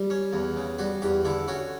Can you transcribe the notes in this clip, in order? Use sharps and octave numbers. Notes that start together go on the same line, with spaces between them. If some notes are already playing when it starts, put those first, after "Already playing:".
Already playing: G3
C#4
E2
C#3
G3 F#4
E2 G4
D3 E4
C#4 F#4